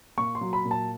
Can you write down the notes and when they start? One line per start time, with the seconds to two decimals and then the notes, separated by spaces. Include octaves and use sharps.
0.18 A#2 C#6
0.35 C6
0.41 F#3
0.53 B5
0.65 A#2
0.71 A5